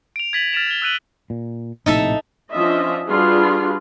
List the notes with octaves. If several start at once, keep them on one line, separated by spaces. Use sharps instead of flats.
D7 F7
G#6 A6 B6 D#7 F#7
F6 A6 B6 D7 E7 F7
G#6 G7
E6 F#6 D#7 F#7
A#2
A#1 A2 C3 D#4 A4 E5
F3 C#4 D4 F4 D#5 E5
G3 D4 F4 F#4 G#4 B4